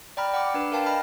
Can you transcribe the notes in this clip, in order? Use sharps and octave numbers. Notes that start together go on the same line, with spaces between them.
D5 G5 A#5 B5 F6
F#5 B5 D6
D4 B4
A#4 F5 G5 A5
D#5 B5 F6